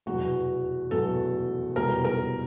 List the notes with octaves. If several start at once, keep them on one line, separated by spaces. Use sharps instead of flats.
F1 E2 B2 F#3 F#4
F1 E2 B2 F#3 A4
F1 E2 B2 G3 A#4
A#4